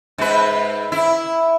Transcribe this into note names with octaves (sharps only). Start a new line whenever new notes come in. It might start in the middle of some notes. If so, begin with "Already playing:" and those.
G#2 B4
E4